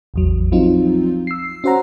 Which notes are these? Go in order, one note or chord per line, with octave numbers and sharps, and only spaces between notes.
A1 E2 F#3
F3 F#3 C4 D#4 F4
E6 C7
C#4 F#4 C5 F#5 A#5